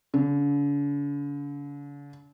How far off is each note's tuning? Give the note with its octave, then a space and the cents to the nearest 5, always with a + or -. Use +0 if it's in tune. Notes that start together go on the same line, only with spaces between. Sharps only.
D3 -45